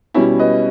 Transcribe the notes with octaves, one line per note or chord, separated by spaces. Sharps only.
B2 G3 C#4 E4
B4 D#5